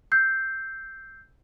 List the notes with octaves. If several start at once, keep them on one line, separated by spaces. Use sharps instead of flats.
E6 G6 C7